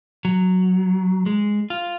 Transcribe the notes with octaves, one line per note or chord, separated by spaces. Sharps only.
F#3
G#3
F4